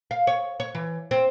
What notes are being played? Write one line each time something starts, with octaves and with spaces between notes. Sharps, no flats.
F5
C#5
C#5
E3
C4